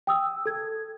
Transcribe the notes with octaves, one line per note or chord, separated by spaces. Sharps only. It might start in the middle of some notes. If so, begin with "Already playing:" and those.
G5 D#6 E6
A4 G#6